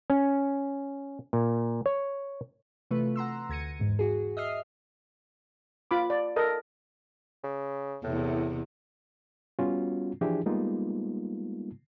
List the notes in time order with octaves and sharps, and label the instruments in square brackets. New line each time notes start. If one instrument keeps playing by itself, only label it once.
[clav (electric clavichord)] C#4
A#2
C#5
[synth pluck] C3 E3 A3 F4 B4
F#5 A#5 C6 E6
D2 G#6 A#6 C#7 D#7
E2 G#2
F#4 G#4
D#5 E5 D#6 F6 C7
[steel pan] F4 B5 D6
D5
A4 A#4 D#5
[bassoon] C#3
[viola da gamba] E2 C3 [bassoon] A2
[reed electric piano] G3 B3 C#4 F4 F#4
E3 F3 D4 E4 G4 G#4
G3 G#3 A#3 B3 D#4 F4